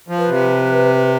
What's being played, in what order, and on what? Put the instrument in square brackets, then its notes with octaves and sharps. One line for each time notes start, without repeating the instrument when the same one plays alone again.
[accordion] F3
[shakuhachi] B4
[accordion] C3